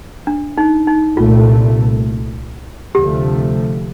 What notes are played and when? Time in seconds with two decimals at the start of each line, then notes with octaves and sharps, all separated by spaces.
0.27 D4
0.58 D#4
0.87 D#4
1.16 C2 A#2 A3 F4
2.95 D2 C3 F3 A3 G4